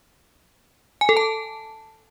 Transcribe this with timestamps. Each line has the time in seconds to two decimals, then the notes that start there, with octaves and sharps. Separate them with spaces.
1.01 G#5
1.09 A4
1.17 A5